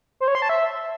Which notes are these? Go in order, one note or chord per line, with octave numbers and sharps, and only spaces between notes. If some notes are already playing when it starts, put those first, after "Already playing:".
C5
C#5
C6
A5
E5